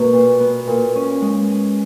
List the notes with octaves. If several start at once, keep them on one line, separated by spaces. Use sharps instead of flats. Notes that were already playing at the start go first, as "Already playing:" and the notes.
Already playing: B2 A#3
A#2
B3
A#2
C#4
G#3
G#4